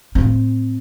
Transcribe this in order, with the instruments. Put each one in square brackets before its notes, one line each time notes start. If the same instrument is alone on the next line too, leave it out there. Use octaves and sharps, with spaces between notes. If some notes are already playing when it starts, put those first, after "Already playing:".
[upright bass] A2 C4